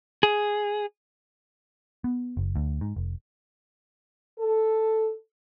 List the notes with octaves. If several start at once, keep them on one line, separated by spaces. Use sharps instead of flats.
G#4
B3
F#1
D2
G#2
F1
A4